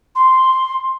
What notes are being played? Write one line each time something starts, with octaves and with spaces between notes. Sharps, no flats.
C6